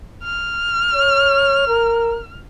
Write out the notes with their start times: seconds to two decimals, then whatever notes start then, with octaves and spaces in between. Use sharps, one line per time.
0.24 F6
0.95 C#5
1.68 A#4